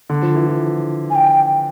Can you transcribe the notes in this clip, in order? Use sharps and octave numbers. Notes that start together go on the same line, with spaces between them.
D3
F3
E3
F3
G#5
G5